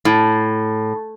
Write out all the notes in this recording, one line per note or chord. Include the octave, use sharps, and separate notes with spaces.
A2